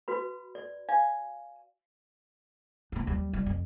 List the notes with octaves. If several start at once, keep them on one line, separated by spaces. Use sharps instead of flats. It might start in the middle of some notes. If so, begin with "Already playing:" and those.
F#4 B4 B5
D5
F5 G#5
A#3 D4
D#2 G3
G3
F2